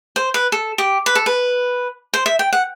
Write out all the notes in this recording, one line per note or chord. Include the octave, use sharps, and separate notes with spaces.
C5
B4
A4
G4
B4
A4
B4
C5
E5
G5
F#5